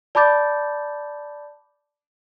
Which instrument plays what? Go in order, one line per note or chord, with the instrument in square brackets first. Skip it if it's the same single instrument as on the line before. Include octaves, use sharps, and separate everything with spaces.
[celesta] D5 A5 B5 D6 G6 A6